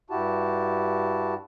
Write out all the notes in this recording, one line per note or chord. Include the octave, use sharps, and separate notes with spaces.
G2 E4 F#4 G4 A5